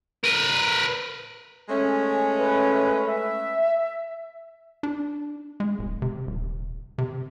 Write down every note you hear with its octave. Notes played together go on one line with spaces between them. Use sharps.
A#4 B4
G#3 A3 C#4
B4
E5
D4
G#3
D1
C3
D#1
C3